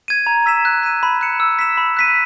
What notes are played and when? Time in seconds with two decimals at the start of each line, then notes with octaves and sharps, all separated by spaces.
0.08 G#6 D#7
0.27 A#5
0.46 E6 B6 E7
0.65 F#6
0.83 B6 D#7
1.03 B5
1.21 F#6 C#7 E7
1.40 E6
1.59 B6 E7
1.78 B5
1.97 F#6 B6 D#7